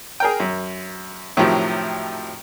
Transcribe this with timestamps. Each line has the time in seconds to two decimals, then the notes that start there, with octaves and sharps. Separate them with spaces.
0.20 G#4 A#4 G5
0.40 F#2
1.37 A2 C3 D#3 F3 F#3